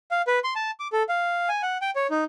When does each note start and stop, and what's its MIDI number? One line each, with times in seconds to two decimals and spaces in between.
0.11 0.22 77
0.27 0.39 71
0.44 0.54 84
0.55 0.71 81
0.80 0.88 86
0.93 1.03 69
1.09 1.49 77
1.49 1.62 80
1.62 1.78 78
1.82 1.91 79
1.96 2.07 73
2.10 2.24 63